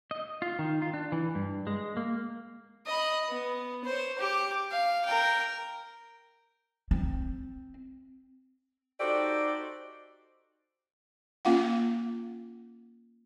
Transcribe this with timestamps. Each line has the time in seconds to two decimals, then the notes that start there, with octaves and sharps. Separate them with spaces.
0.11 D#5
0.42 F4
0.59 D#3
0.82 F4
0.94 D4
1.12 E3
1.35 G2
1.67 G#3
1.97 A#3
2.86 D#5 B5
3.29 B3
3.84 C5 C#5
4.18 G4 D6
4.71 F5
5.05 A#4 G5
6.91 C4
9.00 D#4 F#4 G4 A4 C5 D5
11.45 A#3 C#4 F4 F5 F#5